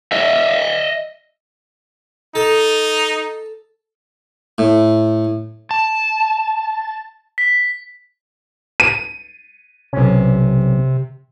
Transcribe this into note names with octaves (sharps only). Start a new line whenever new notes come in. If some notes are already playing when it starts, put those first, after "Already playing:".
D#5 E5
D#4 A4 A5
A2
A5
B6
D#7
B1 C3 C#4